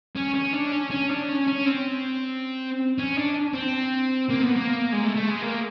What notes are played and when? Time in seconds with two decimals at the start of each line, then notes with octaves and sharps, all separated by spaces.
0.16 C#4
0.35 C#4
0.53 D4
0.72 C#4
0.91 C#4
1.10 D4
1.29 C#4
1.47 C#4
1.66 C4
2.98 C#4
3.16 D4
3.53 C4
4.30 A#3
4.42 B3
4.56 A#3
4.93 G#3
5.04 A3
5.16 A3
5.29 G#3
5.42 A#3